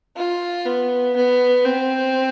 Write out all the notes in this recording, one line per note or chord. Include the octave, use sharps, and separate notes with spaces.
F4
B3
B3
C4